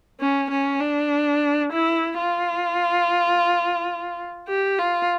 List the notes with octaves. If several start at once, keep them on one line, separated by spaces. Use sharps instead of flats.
C#4
C#4
D4
E4
F4
G4
F4